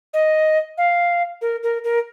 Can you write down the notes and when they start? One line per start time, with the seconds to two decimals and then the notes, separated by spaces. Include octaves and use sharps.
0.14 D#5
0.78 F5
1.41 A#4
1.63 A#4
1.84 A#4